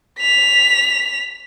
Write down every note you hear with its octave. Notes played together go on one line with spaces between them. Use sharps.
B6 F7